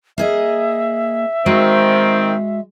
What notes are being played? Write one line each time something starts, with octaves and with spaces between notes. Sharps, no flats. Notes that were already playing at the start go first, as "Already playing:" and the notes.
A#3 G#4 D#5 E5
D#3 G#3 C4 F#4